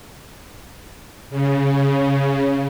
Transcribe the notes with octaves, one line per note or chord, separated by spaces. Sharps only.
C#3